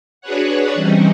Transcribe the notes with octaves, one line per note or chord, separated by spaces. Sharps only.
D4 F#4 G#4 B4 C#5 F#5
E3 G3 C4 C#4 D#4